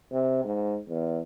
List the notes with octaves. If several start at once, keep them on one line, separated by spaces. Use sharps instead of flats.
C3
G#2
E2